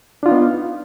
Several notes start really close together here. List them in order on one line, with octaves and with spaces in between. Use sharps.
D4 F4 D#4 B3